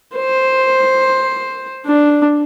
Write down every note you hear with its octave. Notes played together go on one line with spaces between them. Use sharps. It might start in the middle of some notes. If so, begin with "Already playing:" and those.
C5
D4